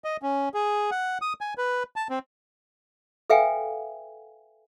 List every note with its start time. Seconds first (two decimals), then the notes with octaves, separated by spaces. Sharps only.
0.04 D#5
0.22 C#4
0.54 G#4
0.91 F#5
1.22 D#6
1.41 G#5
1.58 B4
1.96 A5
2.10 C4
3.30 A4 B4 E5 F5 G5 G#5